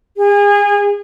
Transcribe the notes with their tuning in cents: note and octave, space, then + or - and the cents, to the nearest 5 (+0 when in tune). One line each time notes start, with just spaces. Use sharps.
G#4 -30